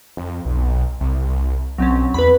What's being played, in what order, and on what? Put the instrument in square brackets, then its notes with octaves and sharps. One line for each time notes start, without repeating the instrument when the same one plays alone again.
[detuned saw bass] F2
B1
C2
[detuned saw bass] B1 [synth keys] F#3 C4 C#4
[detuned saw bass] E2 [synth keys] B4 B5